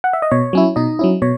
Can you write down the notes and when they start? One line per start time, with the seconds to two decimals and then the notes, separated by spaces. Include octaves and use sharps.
0.04 F#5
0.13 E5
0.22 D#5
0.31 B2 C#5
0.53 F#3 C#4 E4
0.76 B2 D#4 D#5
0.99 F#3 C#4 E4
1.22 B2 C#5